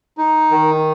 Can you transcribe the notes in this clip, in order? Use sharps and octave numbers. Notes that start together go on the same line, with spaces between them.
D#4
D#3